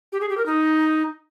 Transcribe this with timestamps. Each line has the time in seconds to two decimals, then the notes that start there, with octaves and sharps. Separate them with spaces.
0.12 G4
0.21 G#4
0.29 G4
0.37 A#4
0.46 D#4